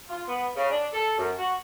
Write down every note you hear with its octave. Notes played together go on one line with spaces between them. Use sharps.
F4
B3
C#3
D4
A4
F#2
F#4